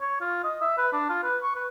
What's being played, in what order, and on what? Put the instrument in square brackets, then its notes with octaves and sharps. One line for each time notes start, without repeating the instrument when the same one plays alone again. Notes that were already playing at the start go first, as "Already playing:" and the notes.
[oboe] C#5
F4
D#5
E5
B4
D4
F4
B4
C#6
B4